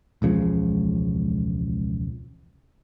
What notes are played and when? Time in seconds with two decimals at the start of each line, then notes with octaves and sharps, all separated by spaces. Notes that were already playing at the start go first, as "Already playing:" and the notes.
0.22 E1 C#2 C#3 F3